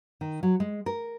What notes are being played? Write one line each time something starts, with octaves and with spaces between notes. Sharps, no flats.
D#3
F#3
G#3
A#4